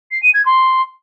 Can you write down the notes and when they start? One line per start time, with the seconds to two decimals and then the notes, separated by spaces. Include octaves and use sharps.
0.11 C7
0.23 D#7
0.34 G#6
0.46 C6